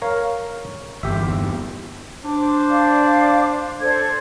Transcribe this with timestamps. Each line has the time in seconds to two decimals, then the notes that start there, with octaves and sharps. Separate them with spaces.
0.02 A#4 C#5 F5
1.03 G1 E2 G4 E5
2.24 D4 C5 D6
2.68 D5 F5 D6
3.81 A4 C5 D5 G#6